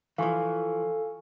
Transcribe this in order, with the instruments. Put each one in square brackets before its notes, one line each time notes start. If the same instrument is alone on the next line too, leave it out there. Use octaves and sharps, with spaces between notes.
[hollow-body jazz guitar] E3 F3 [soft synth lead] A4 [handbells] F5 G#5 C#6